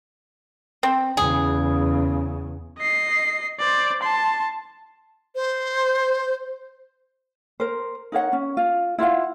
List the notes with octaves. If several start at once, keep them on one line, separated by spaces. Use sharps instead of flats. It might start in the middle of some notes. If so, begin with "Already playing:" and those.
C4
E2 C#3 G#4
D#5 C7
C5 D5
A5 C6
C5
A#4 C5
D#4 A#4 C#5 F#5
C#4
F4
E4 F4 F5 F#5